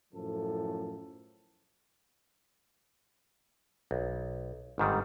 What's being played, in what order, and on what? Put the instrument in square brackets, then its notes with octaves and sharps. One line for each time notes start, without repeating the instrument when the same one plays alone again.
[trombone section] F#2 A2 F3 A4
[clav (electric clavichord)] B1
G1 G#2 D#3 G3